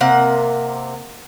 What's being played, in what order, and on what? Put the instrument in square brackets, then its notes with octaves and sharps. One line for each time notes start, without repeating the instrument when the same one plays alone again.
[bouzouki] C3 A#3 F#5